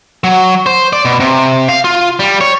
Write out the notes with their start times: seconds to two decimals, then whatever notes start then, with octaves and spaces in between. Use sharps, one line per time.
0.24 F#3
0.66 C5
0.93 D5
1.05 B2
1.20 C3
1.68 F5
1.84 F4
2.20 G3
2.41 C#5